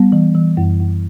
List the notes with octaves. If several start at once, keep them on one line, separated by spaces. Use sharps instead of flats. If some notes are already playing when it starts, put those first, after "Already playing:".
Already playing: G3 B3
E3
E3
F#2
F#2